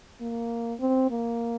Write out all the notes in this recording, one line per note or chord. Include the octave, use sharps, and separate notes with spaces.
A#3
C4
A#3